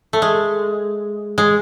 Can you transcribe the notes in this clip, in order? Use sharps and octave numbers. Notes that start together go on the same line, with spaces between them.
A3
G#3
G#3